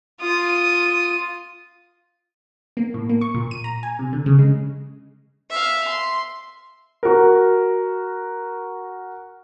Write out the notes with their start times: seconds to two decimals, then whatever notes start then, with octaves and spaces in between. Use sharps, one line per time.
0.20 F4 D#6
2.77 A#3
2.94 A2
3.09 A#3
3.21 C#6
3.34 A#2
3.51 D#7
3.64 A#5
3.83 G#5
3.99 C3
4.13 D3
4.26 C#3
4.39 G#3
5.50 E5 F5
5.88 C6
7.03 F#4 A#4